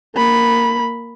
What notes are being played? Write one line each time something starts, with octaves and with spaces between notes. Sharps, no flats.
A#3 B5